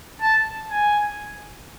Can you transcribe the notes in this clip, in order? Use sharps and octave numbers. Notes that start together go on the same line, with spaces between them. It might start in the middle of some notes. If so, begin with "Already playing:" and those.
A5
G#5